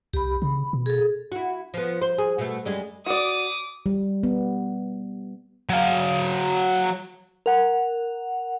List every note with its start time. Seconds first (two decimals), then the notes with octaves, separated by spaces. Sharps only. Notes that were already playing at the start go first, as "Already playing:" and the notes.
0.13 C2 G4 B5
0.42 C#3 B5
0.73 B2
0.86 G#4 A4
1.32 E4 F#4
1.74 F3 B3
2.02 C5
2.18 G#4
2.38 B2 A3
2.65 F#2 G3 G#3
3.06 F#4 D5 D6 D#6
3.86 G3
4.23 B3
5.70 F#3 F5
7.46 A#4 F#5